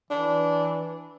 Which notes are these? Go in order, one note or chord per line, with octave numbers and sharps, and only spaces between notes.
E3 D4